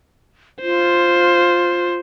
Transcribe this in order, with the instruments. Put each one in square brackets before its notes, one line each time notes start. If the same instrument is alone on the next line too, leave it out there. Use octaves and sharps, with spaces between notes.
[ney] F4 [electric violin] C5